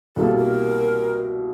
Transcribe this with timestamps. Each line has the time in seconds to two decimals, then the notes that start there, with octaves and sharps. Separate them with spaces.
0.16 C2 B2 G3 A#3 A4
0.37 A#4